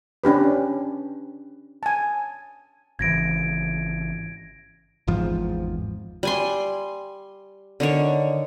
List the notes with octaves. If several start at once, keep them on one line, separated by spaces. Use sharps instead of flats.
C#4 D4 G4 B4
G#5 A5
G#1 C#3 E3 G#6 A#6 D7
G#1 E2 G#2 F3
G3 G#5 C6
D3 D#3 C#5